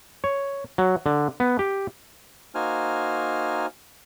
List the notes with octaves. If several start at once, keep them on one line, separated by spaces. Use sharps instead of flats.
C#5
F#3
D3
B3
G4
A#3 D#4 F#4 C5 G#5 F6